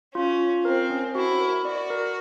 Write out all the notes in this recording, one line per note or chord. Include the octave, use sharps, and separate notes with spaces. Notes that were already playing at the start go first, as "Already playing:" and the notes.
C#4 F4
F4
C4 A#4
C#4
E4 F#4
A#4
F#4 D5
A#4